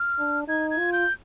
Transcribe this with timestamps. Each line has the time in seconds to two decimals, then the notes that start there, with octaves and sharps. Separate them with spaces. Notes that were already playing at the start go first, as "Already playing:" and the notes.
Already playing: F6
0.19 D4
0.48 D#4 G#6
0.70 G#6
0.78 F4
0.93 G6